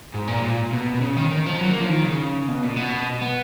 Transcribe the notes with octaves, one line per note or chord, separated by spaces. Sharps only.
G#2
A#2
A#2
B2
B2
C#3
D#3
D#3
F3
F#3
A#3
F3
D#3
C#3
B2
A#2
B2
B3